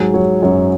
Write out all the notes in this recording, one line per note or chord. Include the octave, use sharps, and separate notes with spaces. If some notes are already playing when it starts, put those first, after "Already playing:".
Already playing: G#2 F#3 G#4
F#3 C#5
F#2 C#5